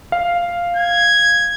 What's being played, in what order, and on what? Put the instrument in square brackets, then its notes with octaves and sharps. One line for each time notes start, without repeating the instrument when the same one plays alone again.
[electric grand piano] F5
[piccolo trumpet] G#6